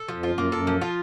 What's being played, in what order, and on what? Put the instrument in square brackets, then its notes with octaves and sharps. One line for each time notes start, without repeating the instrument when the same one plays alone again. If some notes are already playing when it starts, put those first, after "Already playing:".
Already playing: [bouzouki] A4
[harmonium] F2 [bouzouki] F3
[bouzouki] F4
[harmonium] F#2
[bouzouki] A#3
[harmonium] F#2 [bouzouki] A4
[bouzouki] F3
F4